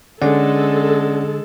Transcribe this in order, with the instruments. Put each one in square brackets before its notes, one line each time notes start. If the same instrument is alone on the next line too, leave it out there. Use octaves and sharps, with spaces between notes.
[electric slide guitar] D3 [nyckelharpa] G#3 [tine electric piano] C#4 D5 F#5 [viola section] A4